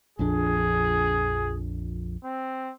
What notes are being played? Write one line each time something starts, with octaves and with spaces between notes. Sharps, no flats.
A#1 F2 D4 G#4
C4